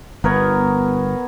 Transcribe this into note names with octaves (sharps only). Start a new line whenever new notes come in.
G1 B3 A#4 C#5